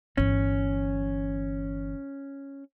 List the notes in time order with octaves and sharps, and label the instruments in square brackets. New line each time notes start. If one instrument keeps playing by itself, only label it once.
[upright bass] G1 E3 [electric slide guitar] C#4